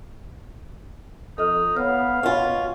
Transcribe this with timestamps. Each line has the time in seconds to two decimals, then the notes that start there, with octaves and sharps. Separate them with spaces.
1.38 F2 D#4 A4 D#5 F6
1.77 B3 C#5 F5 F6
2.23 B2 C#4 F4 F#5 G#5